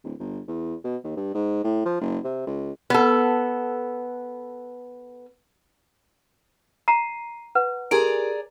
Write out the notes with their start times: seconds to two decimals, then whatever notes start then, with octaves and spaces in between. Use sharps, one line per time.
0.04 D1
0.19 G1
0.48 E2
0.85 B2
1.04 D#2
1.17 G2
1.35 G#2
1.64 A2
1.86 F3
2.01 F#1
2.24 C3
2.47 C#2
2.90 B3 A4
6.88 A#5 C7 D#7
7.55 B4 F#5
7.91 G4 G#4 A#4 D5 A#5 D7